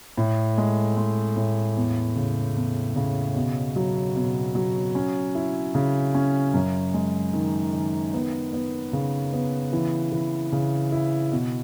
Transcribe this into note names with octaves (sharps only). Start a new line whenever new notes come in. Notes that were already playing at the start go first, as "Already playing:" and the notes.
A2
G#3
G#3
A2
E2
C#3
E2
C#3
B2
F#3
B2
F#3
C#4
E4
C#3
C#4
F#2
G#3
D#3
D#3
B3
B3
C#3
B3
E3
E3
C#3
E4
B2